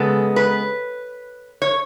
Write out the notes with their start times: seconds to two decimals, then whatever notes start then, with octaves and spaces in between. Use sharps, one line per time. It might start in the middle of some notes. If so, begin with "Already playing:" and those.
Already playing: C#3 G#3 B3 A4
0.36 B4
1.62 C#5